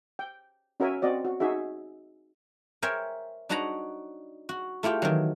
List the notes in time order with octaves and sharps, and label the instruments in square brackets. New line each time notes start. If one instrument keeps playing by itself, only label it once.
[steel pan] G5
C#4 F#4 A#4 E5 G#5
C4 F#4 D5 D#5
F#4
D#4 F#4 G#4 E5
[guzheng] A#4 C5 C#5 E5 G5 G#5
D4 D#4 F#4 B4 C#5 A#5
F#4
A3 E4 F4 G4 G5
D#3 E3 F#3